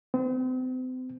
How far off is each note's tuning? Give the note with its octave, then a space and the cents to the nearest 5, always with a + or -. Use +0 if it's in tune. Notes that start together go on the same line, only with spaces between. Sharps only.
C4 -40